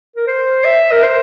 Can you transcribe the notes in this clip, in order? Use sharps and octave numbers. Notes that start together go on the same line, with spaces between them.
A#4
C5
E5
A#4
C5